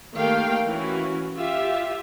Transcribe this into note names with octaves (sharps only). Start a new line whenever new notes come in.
D#3 A3 A#3 G4 F5 G5
E3 C#4 F#4
F4 G4 E5